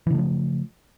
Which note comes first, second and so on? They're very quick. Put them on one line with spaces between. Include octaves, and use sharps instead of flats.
E3 C#3 A3 F3